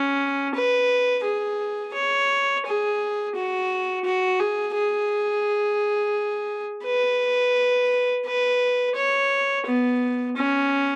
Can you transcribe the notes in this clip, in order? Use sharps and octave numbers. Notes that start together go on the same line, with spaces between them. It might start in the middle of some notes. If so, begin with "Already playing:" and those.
Already playing: C#4
B4
G#4
C#5
G#4
F#4
F#4
G#4
G#4
B4
B4
C#5
B3
C#4